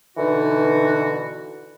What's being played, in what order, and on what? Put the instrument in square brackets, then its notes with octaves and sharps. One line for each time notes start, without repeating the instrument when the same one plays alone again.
[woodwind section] B2 D3 E3 D#4 F#4